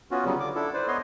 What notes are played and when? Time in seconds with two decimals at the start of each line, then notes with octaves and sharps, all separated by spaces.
0.11 B3 C#4 F4 F#4
0.25 C#3 F#3 G3 B3
0.40 D3 F4 D6
0.55 D4 E4 A4
0.74 B4 C5 D5
0.88 B3 B4 C#5 D#5 C6